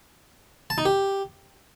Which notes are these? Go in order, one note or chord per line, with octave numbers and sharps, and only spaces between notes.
A5
D#4
G4